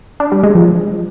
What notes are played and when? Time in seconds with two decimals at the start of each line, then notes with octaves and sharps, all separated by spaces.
0.20 D4
0.32 G3
0.43 G#3
0.55 F3